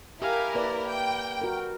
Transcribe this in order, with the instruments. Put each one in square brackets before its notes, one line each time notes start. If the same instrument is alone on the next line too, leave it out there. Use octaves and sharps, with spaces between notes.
[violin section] E4 A#4 [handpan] G4 [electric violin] F5 G#5
[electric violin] A#3 [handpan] B4 D5
[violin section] G5
[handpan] F#4 A#4